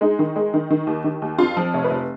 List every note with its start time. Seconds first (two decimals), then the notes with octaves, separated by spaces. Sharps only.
0.01 G#3 D#4
0.19 D#3
0.36 G#3
0.54 D#3
0.70 D#3
0.87 D#2
1.04 D#3
1.22 D#2
1.38 F2 F4
1.57 F3
1.74 F1 C#5
1.84 B4
1.90 F1